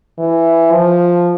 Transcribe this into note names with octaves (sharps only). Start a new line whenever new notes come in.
E3
F3